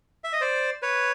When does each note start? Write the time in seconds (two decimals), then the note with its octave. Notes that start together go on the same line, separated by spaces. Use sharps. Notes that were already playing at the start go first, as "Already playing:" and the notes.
0.24 E5
0.33 D#5
0.41 C5 D5
0.82 B4 C#5